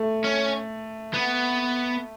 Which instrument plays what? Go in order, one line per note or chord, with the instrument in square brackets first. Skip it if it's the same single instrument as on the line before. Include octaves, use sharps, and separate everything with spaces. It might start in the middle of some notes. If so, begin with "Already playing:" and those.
Already playing: [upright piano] A3
[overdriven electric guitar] C#4
B3